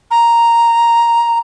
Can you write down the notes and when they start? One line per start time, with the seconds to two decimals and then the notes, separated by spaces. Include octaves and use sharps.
0.11 A#5